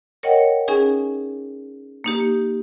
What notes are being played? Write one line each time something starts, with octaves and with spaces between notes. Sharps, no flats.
A#4 C#5 D#5 F#5 G5
C#4 D#4 G#4 G#5
A#3 D#4 G4